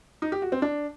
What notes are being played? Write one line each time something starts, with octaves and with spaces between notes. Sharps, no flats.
D#4
G4
F#4
C4
D4